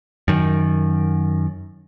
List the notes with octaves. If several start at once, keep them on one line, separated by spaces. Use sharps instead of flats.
F#2 D#3